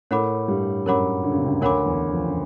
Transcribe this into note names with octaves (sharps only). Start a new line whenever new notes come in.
A2 A3 A#4 C#5 F#5 B5 D6
G2 G3
F#2 F#3 A#4 C#5 F#5 B5 D6
D3
C#3
C3
C#2 C#3
D2 D3 A#4 C#5 F#5 B5 D6
E2 E3
F2 F3
C#3